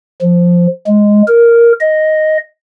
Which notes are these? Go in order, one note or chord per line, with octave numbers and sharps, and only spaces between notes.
F3
G#3
A#4
D#5